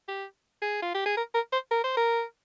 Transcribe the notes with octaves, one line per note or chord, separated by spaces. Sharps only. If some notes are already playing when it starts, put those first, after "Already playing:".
G4
G#4
F4
G4
G#4
A#4
A#4
C5
A#4
C5
A#4